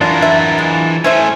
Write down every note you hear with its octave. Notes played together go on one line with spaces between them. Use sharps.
E3 F#3 D4 F4 A#4
E5
G#3
A3 C#4 E4 C5 E5 G#5